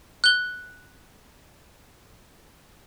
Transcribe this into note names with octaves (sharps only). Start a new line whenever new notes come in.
F#6 G7